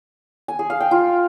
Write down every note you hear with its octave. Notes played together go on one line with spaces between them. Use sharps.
G#5
G#4
F5
G5
F4